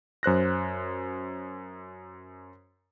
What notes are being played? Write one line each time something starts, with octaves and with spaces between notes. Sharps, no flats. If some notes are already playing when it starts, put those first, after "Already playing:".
F#2 C5 F#6 A#6